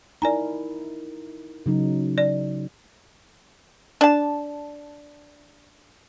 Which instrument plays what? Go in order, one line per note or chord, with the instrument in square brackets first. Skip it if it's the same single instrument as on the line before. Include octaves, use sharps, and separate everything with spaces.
[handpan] D#4 E4 A#4 [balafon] D5 G#5 A#5
[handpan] C#3 F#3 D#4
[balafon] D5
[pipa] D4 A5